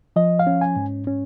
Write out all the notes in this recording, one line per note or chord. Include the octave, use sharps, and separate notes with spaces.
F3 D#5
F5
C#4
G#5
G#2
C#4